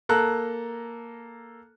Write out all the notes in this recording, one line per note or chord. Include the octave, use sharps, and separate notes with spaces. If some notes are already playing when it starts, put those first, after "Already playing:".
A#3 A4 A#5 F#6